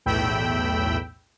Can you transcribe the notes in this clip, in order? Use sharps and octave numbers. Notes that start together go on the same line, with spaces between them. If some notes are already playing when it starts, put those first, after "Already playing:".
B1 E2 A2 G5 B5 E6